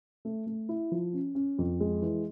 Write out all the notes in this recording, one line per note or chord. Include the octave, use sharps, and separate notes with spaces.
A3
A3
E4
F3
C#4
C#4
F2
G#3
E3